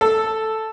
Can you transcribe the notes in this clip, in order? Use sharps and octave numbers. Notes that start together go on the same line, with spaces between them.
A4